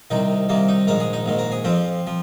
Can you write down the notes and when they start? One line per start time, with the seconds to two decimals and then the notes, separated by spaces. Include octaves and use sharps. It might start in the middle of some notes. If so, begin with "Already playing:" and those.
0.10 C2 C3 D#3 D#4
0.49 C2 C3 D#3 A#3
0.68 D#4
0.87 A#1 G#2 D#3 A#4
1.00 G#4
1.13 D#4
1.26 A#1 G#2 D#3
1.39 A#4
1.52 G#4
1.64 F2 F3 C4
2.07 F3